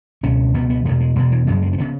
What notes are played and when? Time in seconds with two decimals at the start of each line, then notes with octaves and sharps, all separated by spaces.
0.23 C#2 B2 C#4
0.54 C#2 B2 B3
0.70 B3
0.85 E2 B2 A3
1.00 G#3
1.16 E2 B2 G#3
1.31 E3
1.47 F#2 C#3 F#3
1.63 G#3
1.73 C#4
1.78 C#3 B3